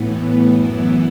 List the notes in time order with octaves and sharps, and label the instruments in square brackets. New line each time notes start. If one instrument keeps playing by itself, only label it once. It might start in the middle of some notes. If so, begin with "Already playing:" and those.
Already playing: [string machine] A2 E3 B3
F#2 E3 B3 E4